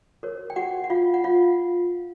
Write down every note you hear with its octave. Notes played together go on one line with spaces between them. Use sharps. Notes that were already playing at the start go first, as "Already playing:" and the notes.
F#4 A#4 C#5
G5
F#4 F#5
F#5
F4 F5
F#5
F4 F5